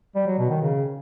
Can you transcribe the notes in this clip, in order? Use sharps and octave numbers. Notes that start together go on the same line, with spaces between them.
G3
F#3
B2
D#3
C#3